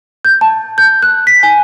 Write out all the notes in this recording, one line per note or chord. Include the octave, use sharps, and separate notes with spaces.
G6
A5
G6
F#6
B6
G#5